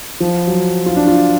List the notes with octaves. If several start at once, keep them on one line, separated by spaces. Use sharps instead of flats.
F3
F#3
F4
D4
F4